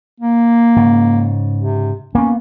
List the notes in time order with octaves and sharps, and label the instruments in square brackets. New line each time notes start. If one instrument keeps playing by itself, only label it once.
[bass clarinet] A#3
[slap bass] G#2 C#3
[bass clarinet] C3
[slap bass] A#3 B3 [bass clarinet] C#4